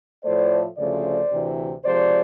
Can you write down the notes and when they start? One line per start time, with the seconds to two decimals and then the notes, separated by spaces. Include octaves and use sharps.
0.23 A2 F3 A3 C5 D5
0.77 D2 C#3 F3 A3 C5 D5
1.30 D2 C3 E3
1.84 C3 F3 G#3 C5 D5